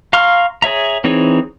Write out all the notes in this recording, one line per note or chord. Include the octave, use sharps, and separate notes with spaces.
F5 A#5 C6 C#6 F6
G#4 C#5 E5 A#5
E3 C4 D#4 G#4 C#5